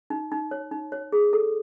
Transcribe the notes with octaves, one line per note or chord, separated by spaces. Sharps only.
D#4
D#4
C#5
D#4
C#5
G#4
A4